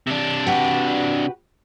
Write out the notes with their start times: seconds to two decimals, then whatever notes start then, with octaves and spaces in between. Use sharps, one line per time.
0.07 C3 D4
0.47 F#4 G4 B4